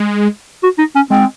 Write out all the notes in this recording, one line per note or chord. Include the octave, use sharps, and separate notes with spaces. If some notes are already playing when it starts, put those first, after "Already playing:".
Already playing: G#3
F#4
D#4
C#4
G#3 C4